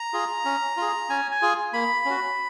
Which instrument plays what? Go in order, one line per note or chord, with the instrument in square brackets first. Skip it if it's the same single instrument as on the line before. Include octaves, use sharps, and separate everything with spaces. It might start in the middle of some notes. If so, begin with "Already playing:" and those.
Already playing: [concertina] A#5
F4 G#4
C#4
F4 G#4
C#4 G#5
G#5
F4 G#4
A#3 B5
C#4 F#4